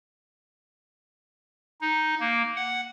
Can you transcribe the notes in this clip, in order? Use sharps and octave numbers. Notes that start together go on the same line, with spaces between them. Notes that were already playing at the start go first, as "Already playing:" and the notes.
D#4
A#3
F#5